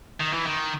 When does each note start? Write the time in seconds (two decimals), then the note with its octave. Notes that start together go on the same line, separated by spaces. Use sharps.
0.20 D#3
0.33 E3
0.46 D#3